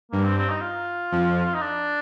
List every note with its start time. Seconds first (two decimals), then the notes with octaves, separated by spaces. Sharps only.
0.12 G2 A#3
0.24 C4
0.38 C4
0.49 D#4
0.61 F4
1.12 F2 F3
1.46 F4
1.54 D#4
1.61 D4